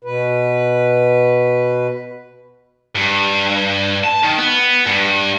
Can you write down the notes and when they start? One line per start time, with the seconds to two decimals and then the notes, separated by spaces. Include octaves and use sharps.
0.04 B2 B4
2.95 G2
4.04 A5
4.23 D#3
4.38 B3
4.86 G2